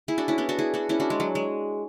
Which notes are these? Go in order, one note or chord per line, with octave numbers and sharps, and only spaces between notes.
E4 G#4
D4 F#4
C#4 E4
B3 D4
D4 F#4
E4 G#4
D4 F#4
C#4 E4
D4 F#4
G#3
F#3
G#3